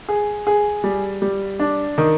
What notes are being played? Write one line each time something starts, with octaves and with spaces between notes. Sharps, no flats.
G#4
G#4
G3
G3
D4
D#3